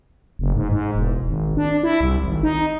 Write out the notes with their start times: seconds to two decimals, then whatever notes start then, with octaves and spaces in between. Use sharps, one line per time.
0.39 F#1
0.55 G#2
0.71 G#2
0.95 E1
1.28 G#1
1.57 D4
1.83 E4
2.01 C2
2.24 G#1
2.43 D#4